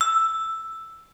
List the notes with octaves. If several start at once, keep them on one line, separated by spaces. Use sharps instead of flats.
E6